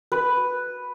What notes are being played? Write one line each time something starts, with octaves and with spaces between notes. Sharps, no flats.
B4